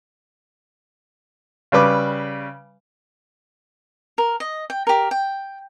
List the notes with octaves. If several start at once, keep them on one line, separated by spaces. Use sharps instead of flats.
C#3 G3 B4 D6
A#4
D#5
G5
G4 A#4
G5